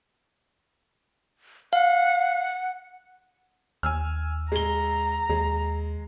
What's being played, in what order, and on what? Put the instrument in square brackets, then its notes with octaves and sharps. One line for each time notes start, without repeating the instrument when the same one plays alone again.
[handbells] F5 [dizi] F#5
[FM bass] D#2 [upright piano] G#5 E6 F6
[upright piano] G#3 G7 [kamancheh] A#5
[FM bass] D#2 [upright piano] G#3